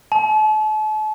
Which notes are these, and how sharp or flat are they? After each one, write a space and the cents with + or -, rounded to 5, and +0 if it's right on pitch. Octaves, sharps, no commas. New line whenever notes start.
A5 -40